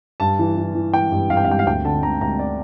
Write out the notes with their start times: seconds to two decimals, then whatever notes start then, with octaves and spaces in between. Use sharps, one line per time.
0.20 G2 A5
0.39 E3
0.57 E3
0.75 E3
0.93 E3 G5
1.12 G2
1.30 G2 F5
1.37 G5
1.45 F5
1.48 G2 G5
1.59 F5
1.67 D2 G5
1.85 D3 A5
2.03 D2 A#5
2.21 D2 A#5
2.39 D5